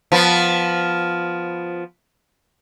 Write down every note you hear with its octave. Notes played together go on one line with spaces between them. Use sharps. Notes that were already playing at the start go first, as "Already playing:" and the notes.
F3 B3